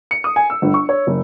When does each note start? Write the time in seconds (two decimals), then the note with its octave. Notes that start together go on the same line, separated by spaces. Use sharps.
0.11 C#7
0.24 D#6
0.36 G#5
0.50 E6
0.62 G1
0.74 C#6
0.89 C#5
1.07 F#1